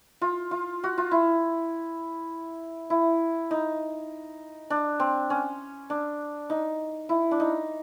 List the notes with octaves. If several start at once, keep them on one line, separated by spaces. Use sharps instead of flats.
F4
F4
F#4
F4
E4
E4
D#4
D4
C4
C#4
D4
D#4
E4
D4
D#4